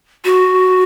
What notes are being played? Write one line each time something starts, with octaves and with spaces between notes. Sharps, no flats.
F#4